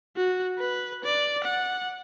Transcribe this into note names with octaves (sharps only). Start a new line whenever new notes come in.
F#4
B4
D5
F#5